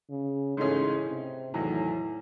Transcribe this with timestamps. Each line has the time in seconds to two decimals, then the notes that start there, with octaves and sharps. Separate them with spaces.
0.10 C#3
0.57 G#2 C#3 E3 A3 C#4 G#4
1.06 C3
1.53 E2 A2 D#3 F#3